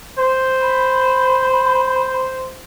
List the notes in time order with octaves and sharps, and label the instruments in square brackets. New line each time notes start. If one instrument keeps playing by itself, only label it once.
[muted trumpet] C5
[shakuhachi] B5